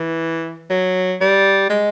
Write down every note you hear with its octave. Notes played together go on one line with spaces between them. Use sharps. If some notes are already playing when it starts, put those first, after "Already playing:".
Already playing: E3
F#3
G3
G#3